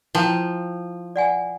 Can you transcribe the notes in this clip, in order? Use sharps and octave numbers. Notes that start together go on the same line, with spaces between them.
F3 E4 G5
D5 F#5 G#5